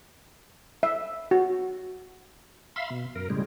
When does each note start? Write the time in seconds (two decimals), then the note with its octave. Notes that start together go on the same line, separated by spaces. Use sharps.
0.83 E5
1.31 F#4
2.76 E5 F5 B5 C6
2.90 B2
3.15 F#2 A#4
3.30 A2 C#3 G3 G#3